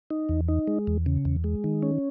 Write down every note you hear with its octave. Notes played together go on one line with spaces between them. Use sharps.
D#4
E2
D#4
G#3
E2
C#3
E2
G#3
D#3
C#4